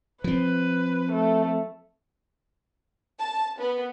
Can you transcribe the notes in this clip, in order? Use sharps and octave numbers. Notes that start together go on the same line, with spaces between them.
F3 C4 B4
A3
A5
B3